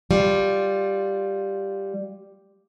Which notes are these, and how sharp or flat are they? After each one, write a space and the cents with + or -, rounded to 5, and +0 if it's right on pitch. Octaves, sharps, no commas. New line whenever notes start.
G3 +0 F4 +5